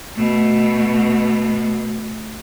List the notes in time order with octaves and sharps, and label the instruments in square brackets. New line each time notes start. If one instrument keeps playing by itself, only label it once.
[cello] B2 A3